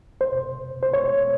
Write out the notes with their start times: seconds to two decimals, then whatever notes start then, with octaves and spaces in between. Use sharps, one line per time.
0.21 C5
0.83 C5
0.94 C#5